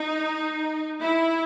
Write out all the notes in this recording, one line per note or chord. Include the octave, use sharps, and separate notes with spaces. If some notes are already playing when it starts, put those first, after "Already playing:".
Already playing: D#4
E4